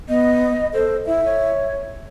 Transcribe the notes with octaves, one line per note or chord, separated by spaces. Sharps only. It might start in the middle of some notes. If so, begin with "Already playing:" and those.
B3 D#5
A4 C5
E4 E5
C#5